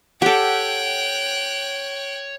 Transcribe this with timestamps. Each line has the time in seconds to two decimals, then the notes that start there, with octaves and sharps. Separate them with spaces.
0.22 G4 A4 C#5 F#5 G5 F#6